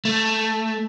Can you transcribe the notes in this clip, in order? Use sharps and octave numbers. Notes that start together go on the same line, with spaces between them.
A3